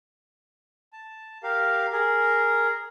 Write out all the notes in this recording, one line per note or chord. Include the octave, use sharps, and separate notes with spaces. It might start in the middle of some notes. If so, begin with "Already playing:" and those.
A5
G4 A#4 F5
G#4 A#4